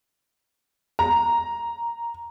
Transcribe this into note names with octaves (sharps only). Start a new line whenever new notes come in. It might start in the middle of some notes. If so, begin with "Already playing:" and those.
A#5